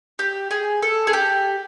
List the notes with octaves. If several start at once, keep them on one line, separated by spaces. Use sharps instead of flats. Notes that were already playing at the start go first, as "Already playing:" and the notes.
G4
G#4
A4
G#4
G4